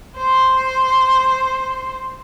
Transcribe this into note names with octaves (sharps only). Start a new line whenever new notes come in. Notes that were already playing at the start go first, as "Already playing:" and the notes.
C5 C6